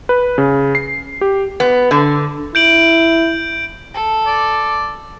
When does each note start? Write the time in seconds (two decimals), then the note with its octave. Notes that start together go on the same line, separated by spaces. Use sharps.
0.09 B4
0.38 C#3
0.75 C7
1.21 G4
1.60 B3
1.91 D3
2.55 E4 G6 D7 F#7
3.94 A4
4.27 D5